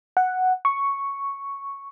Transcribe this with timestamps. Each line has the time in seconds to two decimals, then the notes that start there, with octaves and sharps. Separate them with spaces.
0.17 F#5
0.65 C#6